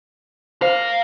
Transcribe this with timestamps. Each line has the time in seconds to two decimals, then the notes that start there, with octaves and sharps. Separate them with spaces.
0.62 A#4 C5 F5